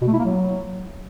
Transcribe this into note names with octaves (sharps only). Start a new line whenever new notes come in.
B2
A3
E4
A#3
F#3